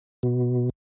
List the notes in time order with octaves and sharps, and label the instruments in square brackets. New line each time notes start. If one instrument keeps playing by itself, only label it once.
[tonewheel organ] B2